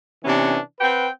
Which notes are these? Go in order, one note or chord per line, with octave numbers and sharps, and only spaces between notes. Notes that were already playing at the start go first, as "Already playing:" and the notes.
C3 E3 B3 C#4 D4
C4 B4 F#5 G5